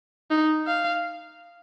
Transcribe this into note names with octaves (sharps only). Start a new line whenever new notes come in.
D#4
F5